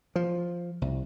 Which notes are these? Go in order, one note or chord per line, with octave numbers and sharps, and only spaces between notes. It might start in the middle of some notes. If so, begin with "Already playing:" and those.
F3
C2